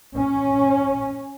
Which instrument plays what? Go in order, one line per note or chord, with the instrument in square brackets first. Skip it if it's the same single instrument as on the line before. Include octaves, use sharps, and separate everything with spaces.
[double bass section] C#4